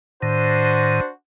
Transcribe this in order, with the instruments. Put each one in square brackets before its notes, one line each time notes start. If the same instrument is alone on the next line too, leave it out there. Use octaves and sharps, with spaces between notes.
[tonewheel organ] A2 D#3 [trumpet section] D4 F#4 C5